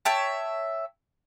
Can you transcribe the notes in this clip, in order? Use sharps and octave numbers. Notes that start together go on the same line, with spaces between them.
C#5 E5 G5 A5